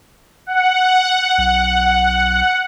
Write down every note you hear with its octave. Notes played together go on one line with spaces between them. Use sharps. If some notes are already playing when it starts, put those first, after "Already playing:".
F#5
B1